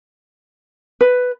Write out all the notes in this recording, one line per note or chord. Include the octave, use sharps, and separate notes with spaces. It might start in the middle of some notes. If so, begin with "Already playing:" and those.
B4